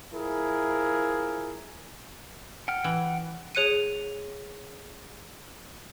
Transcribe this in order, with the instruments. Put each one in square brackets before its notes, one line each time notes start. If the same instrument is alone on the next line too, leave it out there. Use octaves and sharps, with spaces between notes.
[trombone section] F3 E4 G#4 A#4
[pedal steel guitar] F#5 G5 F6
[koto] E3
[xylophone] G#4 C#5 F#6 C#7 D#7